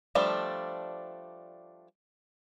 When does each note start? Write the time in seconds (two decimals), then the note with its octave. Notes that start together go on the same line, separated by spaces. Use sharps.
0.15 F3 G3 A3 D4